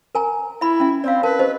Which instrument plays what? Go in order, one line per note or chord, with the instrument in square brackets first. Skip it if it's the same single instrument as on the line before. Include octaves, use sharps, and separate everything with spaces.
[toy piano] A#4 G#5 A#5
[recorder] E4 [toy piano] E5 B5
[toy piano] C#4 E5
[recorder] C4 [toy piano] D5 F5
[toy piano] A#4 A5 [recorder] B4
[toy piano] G4 C5 D#5